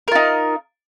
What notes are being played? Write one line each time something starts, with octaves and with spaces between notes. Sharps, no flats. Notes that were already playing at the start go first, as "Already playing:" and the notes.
D#4 F4 A#4